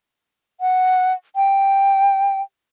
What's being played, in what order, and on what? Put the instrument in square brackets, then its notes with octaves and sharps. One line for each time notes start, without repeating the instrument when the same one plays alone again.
[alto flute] F#5
G5